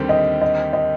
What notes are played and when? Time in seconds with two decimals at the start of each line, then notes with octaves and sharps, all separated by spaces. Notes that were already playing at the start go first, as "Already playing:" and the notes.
Already playing: D#2 D3 G3 C4 G4
0.09 D#5
0.41 D#5
0.73 D#5